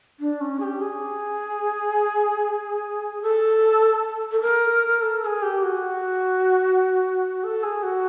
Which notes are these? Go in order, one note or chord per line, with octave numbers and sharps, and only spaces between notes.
D4
C#4
G#4
G4
G#4
A4
A4
A#4
A4
A4
G#4
G4
F#4
A4
G#4
F#4